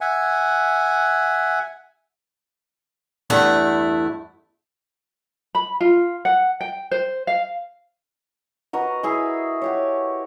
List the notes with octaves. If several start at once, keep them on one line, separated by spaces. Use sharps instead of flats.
E5 F#5 G#5
E2 G2 A3 E4 F#5
B5
F4
F#5
G5
C5
F5
F#4 A#4 B4 D#5
E4 G#4 E5
F#4 G4 C#5